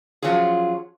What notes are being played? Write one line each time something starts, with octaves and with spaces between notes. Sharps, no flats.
F3 F#3 C#4 F4 G#4